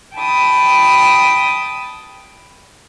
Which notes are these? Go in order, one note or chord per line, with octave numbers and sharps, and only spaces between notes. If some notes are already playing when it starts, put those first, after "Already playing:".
G5 A5 B5 D#6